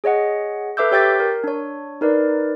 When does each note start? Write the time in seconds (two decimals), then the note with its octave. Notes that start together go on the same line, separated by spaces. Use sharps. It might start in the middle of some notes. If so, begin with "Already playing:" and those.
0.04 G#4 C#5 D#5 F#5
0.77 A4 B4 E5 D6 E6 G6
0.92 G4 C#5 G5 G6 A6 B6
1.20 A#4
1.44 D4 C#5
2.01 D#4 A#4 B4 D5